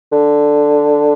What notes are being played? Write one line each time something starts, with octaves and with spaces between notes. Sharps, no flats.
D3